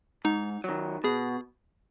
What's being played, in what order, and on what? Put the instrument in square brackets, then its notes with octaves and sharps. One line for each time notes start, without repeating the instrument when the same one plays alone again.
[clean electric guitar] G#2 [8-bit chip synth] D#4
[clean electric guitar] D#3 F#3
[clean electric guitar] B2 [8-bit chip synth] G#4